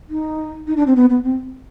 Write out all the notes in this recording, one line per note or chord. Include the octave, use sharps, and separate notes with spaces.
D#4
D#4
D4
C4
B3
B3
C4